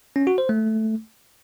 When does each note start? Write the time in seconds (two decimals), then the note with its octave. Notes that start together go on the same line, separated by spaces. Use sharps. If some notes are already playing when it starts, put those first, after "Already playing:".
0.16 C#4
0.27 F#4
0.38 C5
0.49 A3